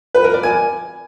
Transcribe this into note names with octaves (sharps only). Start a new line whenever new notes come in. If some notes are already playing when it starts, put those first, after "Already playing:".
B4
A#4
D5
G#5